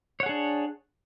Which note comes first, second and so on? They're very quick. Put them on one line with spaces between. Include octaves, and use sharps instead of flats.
C#5 F#5 G#4 D4